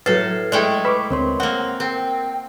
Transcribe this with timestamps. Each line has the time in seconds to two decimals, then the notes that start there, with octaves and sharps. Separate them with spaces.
0.06 A2 F#3 A4 B4 F6 A6 C7
0.52 G#3 A3 E4 D5 G5
0.85 B4 B5 C#6 D6
1.10 D2 C4 A#4 C#5 C6
1.40 A#3 C4 F#5
1.80 C4 A#4 G5